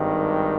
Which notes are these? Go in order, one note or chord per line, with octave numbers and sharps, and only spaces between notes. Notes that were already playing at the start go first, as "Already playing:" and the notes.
Already playing: G#1 G2 D#3